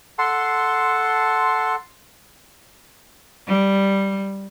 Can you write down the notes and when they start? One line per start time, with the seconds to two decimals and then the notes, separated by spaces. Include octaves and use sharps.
0.18 A4 F#5 A5 C6
3.48 G3